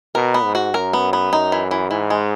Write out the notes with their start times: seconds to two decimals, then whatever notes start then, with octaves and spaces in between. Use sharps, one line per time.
0.15 B2 A#4
0.34 B3
0.45 G#2
0.55 F#4
0.74 F#2 A#4
0.93 B3
1.13 B3
1.32 F#2 D#4
1.52 E3
1.71 E3
1.90 G#2 E3
2.10 G#3